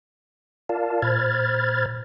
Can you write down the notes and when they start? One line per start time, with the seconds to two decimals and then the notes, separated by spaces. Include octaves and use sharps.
0.69 F4 A#4 D5 F5 A5
1.02 A#2 C5 B5 F6 G#6 A6